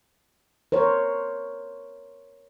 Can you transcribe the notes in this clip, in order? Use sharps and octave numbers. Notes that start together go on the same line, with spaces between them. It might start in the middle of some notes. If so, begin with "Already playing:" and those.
A#4 C5 C#5